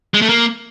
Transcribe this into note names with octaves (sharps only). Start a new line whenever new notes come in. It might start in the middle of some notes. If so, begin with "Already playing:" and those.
G#3
A3
A#3